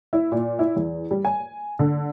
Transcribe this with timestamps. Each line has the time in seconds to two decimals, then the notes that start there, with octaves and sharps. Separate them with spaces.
0.13 E4
0.32 A#2
0.59 E4
0.76 E2
1.11 G3
1.25 G#5
1.79 D3